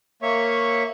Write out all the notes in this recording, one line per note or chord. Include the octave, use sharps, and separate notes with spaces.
A#3 C#5 E5 C#6